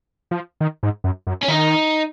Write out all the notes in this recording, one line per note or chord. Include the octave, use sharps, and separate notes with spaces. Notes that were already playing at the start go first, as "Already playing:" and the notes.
F3
D#3
G#2
F#2
F#2
C#4
D#3 D#4